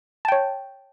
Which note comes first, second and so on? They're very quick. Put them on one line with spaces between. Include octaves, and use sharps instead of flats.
A5 G5 C#5